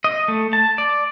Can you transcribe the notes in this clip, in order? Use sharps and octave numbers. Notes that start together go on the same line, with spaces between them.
D#5
A3
A5
D5